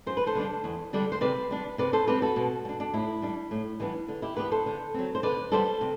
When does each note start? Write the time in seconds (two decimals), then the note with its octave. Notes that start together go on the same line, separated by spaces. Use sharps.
0.06 F#2 C5
0.17 B4
0.26 A4 C5
0.35 D3 G3 D4
0.64 E2
0.93 D3 G3 D4
1.12 C5
1.21 C3 B4 D5
1.51 G3 D4
1.78 C3 B4 D5
1.93 A4 C5
2.07 G3 C4 G4 B4
2.22 F#4 A4
2.36 B2
2.65 G3
2.69 D4
2.80 D4
2.94 A2 E4
3.22 G3 D4
3.51 A2
3.80 E3 G3 B3 D4
4.08 D3
4.22 E4 G4
4.37 G3 B3 D4 G4 B4
4.52 A4 C5
4.66 D3
4.94 F#3 C4
5.15 C5
5.23 D3 B4 D5
5.52 G3 B3 D4 A4 C5
5.81 C3